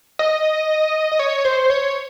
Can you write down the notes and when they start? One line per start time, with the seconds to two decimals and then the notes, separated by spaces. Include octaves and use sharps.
0.19 D#5
1.12 D#5
1.19 C#5
1.45 C5
1.70 C#5